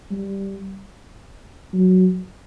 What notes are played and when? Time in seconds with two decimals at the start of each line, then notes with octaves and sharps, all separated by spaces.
0.11 G3
1.73 F#3